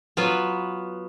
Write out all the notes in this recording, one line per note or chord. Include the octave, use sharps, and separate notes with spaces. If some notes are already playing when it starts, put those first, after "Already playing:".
F#3 B3 F4 B4